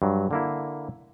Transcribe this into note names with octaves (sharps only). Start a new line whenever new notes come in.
G2 F#3
D3 A#3 E4